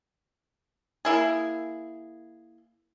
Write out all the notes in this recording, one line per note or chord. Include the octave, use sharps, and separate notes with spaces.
A#3 E4 G#4